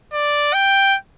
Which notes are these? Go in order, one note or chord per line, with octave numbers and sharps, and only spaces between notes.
D5
G5